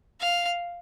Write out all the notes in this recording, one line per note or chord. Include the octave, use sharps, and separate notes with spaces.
F5